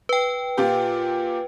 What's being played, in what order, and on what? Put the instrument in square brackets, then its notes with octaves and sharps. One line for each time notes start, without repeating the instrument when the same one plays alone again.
[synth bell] B4 G5
[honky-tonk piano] A#2 F4 G4